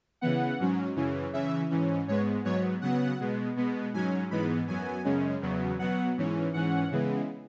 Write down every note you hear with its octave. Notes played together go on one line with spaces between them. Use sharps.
C#3 E3 B3 F#5
G#2 F#3 C#4
F#2 C#3 E3 C#4
C#3 E3 C#4 E5
G#2 E3 C#4
G#2 G#3 B3 C#5
G#2 F#3 B3 C#5
C#3 F#3 B3 F#5
B2 G#3 B3
B2 G#3 B3
G#2 F#3 C#4 G#5
G#2 E3 G#3 B3 B5
F#2 F#3 B3 G#5
F#2 C#3 G#3 C#4
E2 C#3 F#3 B3
B2 F#3 B3 F#5
G#2 E3 C#4
G#2 E3 C#4 F#5
C#3 E3 G#3 B3